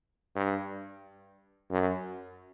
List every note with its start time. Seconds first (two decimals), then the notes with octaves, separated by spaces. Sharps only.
0.36 G2
1.71 F#2